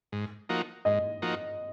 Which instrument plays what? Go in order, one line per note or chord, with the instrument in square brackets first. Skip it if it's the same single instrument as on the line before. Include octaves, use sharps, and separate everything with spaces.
[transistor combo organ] G#2
F3 A#3 D#4 F#4
[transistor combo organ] G#2 [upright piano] D#5
[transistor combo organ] F3 A#3 D#4 F#4